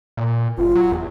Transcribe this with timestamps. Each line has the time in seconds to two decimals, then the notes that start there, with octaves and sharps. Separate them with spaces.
0.17 A#2
0.58 F#1 F4
0.75 F#3
0.92 E2